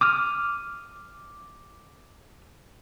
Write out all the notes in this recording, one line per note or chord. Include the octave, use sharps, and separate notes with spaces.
D6 D#6 F6